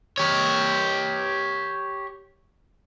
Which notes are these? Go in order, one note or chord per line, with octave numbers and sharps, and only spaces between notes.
G4 C#5